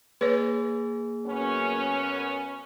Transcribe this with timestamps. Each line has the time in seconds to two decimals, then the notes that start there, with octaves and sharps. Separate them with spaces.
0.21 A#3 G#4 B4 C#5
1.26 F#2 B3 C#4